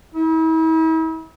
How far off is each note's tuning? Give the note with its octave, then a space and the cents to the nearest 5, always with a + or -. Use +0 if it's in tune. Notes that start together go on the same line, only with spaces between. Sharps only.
E4 -40